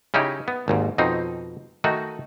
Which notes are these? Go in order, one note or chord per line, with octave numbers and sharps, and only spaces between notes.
C#3 C#4 D#4 E4 G4
B3
G#1 D#2 G#2
F2 B2 C4 D#4
D#3 A3 D#4 F#4